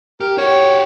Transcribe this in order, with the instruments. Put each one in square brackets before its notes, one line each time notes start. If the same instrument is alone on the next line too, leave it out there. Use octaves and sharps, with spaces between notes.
[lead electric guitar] G4 [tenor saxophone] A#4
[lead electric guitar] F#4 G4 [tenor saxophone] C#5